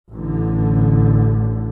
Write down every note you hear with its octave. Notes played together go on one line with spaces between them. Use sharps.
A1 A2 D3